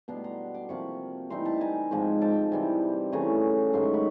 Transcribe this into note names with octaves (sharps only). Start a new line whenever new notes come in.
B2 G3 B3 D4 A#5 C6
A#5 C6
C6 D6
C3 F3 A#3 B5 C#6
E3 G3 C4 D#4 A#5 C6
A5 B5
G#5 A#5
G#2 F3 G#3 C4
G5 A5
C3 E3 G3 C4
C#3 E3 A3 G#5 A#5
G#2 D#3 F#3 A3 A#5 C6
B5 C#6
B5 C#6